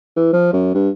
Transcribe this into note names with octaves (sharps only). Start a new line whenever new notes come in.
E3
F3
F#2
G2